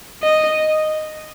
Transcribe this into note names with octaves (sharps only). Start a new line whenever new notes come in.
D#5